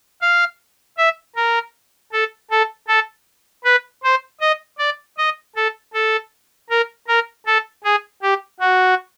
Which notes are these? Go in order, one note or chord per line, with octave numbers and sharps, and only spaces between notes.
F5
E5
A#4
A4
A4
A4
B4
C5
D#5
D5
D#5
A4
A4
A#4
A#4
A4
G#4
G4
F#4